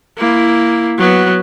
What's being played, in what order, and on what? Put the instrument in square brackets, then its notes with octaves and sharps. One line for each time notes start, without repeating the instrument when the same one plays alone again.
[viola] A#3 E4
F#3 B3